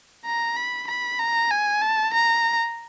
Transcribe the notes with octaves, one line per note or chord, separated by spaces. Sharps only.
A#5
B5
B5
A#5
G#5
A5
A#5